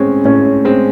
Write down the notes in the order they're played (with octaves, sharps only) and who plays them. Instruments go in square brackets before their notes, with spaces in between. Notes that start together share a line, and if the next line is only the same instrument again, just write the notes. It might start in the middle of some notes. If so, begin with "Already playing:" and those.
Already playing: [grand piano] A2 G#3 C4 [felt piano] C#4
[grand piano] A2 [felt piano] C#4
[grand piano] G#3 C4